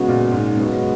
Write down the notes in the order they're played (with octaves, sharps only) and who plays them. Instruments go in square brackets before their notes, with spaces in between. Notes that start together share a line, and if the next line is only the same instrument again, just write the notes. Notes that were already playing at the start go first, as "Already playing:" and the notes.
Already playing: [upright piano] C#3 [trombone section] G#3 B3 F#4
[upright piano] A#2
G#2
[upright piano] F#2 [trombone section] C#3 G#3 B3 F#4